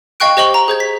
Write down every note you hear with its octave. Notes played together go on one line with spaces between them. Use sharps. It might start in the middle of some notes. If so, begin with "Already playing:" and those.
D#5 F5 G5 C#6 F#6 D7
G4 C5 D#5 C#6 F#7 G7
A#5
G#4 C5 G#6
B6